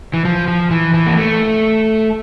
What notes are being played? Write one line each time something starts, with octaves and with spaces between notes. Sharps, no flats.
E3
F3
F3
E3
E3
A#3
A3